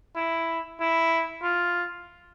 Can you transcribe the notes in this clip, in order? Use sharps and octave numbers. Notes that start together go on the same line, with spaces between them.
E4
E4
F4